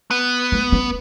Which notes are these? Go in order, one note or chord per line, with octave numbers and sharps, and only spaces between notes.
B3
A3
C#4